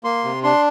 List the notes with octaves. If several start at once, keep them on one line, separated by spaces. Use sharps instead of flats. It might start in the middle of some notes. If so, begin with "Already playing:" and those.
A#3 C6
C3
D4 C6